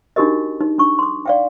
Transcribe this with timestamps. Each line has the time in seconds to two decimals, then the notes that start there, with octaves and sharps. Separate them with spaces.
0.16 D4 D#4 F#4 G4 A#4 D#5
0.61 D#4
0.78 D4 D#4 C#6
0.99 C6 D6
1.25 D5 F5 G5